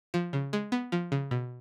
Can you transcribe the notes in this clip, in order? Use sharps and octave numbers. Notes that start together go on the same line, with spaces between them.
F3
C#3
G#3
B3
F3
C#3
B2